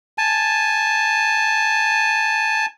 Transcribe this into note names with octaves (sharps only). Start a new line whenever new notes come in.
G#5 A5